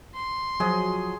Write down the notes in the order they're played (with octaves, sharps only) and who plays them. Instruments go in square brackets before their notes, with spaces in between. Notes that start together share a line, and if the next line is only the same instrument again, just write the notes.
[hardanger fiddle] C6
[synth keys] F3 F#3 [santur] G#4 D#5